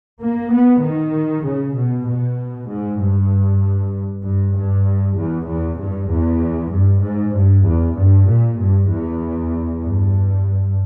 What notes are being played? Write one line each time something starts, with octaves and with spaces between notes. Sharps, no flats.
A#3
B3
D#3
C#3
B2
B2
G#2
G2
G2
G2
E2
E2
G2
E2
G2
G#2
G2
E2
G2
A#2
G2
E2
G2